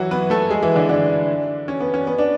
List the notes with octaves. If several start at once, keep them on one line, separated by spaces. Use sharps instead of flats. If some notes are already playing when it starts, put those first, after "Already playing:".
Already playing: E3 F#3 E4 F#4
B3 B4
A3 A4
G#3 G#4
E3 E4
D3 D4
D3 D4
C#4
B3
C#4
B3
D4